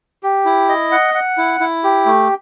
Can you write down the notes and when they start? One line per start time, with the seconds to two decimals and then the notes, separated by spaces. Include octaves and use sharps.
0.23 G4
0.45 E4
0.69 D#5
0.91 F#5
1.15 F#5
1.38 E4
1.60 E4
1.84 G4
2.06 A3